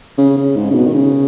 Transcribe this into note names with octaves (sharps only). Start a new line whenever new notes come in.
C#3
C#3
G#2
C#3
B2
D#3
C#3